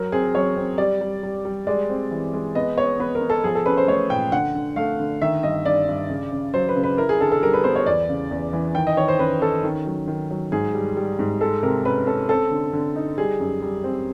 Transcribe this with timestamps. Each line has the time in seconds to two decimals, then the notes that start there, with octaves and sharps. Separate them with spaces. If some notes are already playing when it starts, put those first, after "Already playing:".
Already playing: F#3 A#4
0.12 C4 G#4
0.34 F#3 C#5
0.57 C4
0.78 G3 D5
1.01 G3
1.23 G3
1.45 G3
1.67 G#3 D5
1.90 C4
2.11 E3
2.33 G#3
2.55 B3 D#5
2.77 B3 C#5
2.99 B3 B4
3.15 A#4
3.21 B3
3.30 A4
3.44 F3 G#4
3.55 A4
3.66 C#4 B4
3.77 C5
3.88 A3 C#5
4.10 A#2 G5
4.32 D3 F#5
4.54 D3
4.76 A3 F5
4.99 D3
5.22 D#3 E5
5.43 G2 D#5
5.66 G2 D5
5.88 G2
6.10 C#3
6.32 C#3
6.54 F#3 C5
6.69 B4
6.76 C#3
6.83 B4
6.98 E4 A#4
7.09 G#4
7.21 D3 A4
7.32 A4
7.42 G3 A#4
7.53 B4
7.64 B3 C5
7.76 C#5
7.86 E2 D5
8.09 C#3
8.31 E2
8.53 E3
8.75 D#3 G5
8.87 D#5
8.97 D#3 C#5
9.08 C5
9.19 C#4 B4
9.42 C#4 A4
9.63 D#3
9.86 F#3
10.08 D#3
10.31 F#3
10.52 G#2 G#4
10.74 G3
10.97 G3
11.19 G#2
11.41 G#3 A4
11.63 C3 A#4
11.85 C#4 B4
12.07 C#4 A4
12.29 C4 A4
12.51 D3
12.73 D3
12.96 D#4
13.18 G3 G#4
13.40 F#2
13.62 G3
13.84 C4